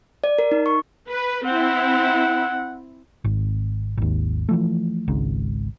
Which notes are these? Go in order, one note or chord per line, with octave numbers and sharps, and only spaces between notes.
D5
A#4
D#4
C#6
B4
C4 E4 F#5
G#1
G#1 D#2
E3 F3 A3
G#1 C#2 G#2